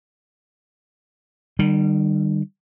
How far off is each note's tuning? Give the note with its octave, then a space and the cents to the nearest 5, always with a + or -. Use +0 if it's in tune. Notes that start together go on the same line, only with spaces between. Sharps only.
D#3 -45 G3 +0